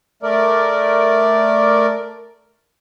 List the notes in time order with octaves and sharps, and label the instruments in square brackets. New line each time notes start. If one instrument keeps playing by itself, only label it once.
[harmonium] A3 A#4 D5